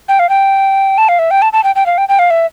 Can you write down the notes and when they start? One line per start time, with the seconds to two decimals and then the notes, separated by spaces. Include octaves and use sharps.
0.08 G5
0.19 F5
0.29 G5
0.98 A5
1.08 F5
1.19 E5
1.31 G5
1.42 A5
1.53 A5
1.63 G5
1.75 G5
1.86 F5
1.98 G5
2.09 G5
2.19 F5
2.30 E5